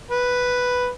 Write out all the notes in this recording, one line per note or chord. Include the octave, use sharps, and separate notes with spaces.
B4